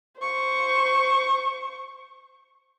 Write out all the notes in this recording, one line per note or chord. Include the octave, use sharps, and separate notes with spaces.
C5 C#6